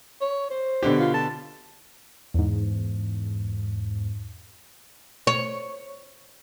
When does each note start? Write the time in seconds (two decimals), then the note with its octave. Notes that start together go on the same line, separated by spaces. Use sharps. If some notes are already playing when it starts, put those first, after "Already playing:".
0.21 C#5
0.50 C5
0.83 B2 D3 G4
0.99 F4
1.14 A5
2.34 E2 G#2
5.27 C#5